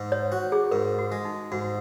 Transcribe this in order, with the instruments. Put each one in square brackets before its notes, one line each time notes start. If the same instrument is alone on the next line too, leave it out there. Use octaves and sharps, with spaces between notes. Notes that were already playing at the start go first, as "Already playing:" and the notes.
Already playing: [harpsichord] G#2
[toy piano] C#5
[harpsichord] F#4
[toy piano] G#4
[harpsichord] G#2 [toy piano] A#4
[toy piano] F#4
[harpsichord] G#3
[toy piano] D#4
[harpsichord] G#2 [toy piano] F#4